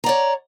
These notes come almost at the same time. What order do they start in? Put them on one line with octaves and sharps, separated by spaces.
A#5 D5 C#5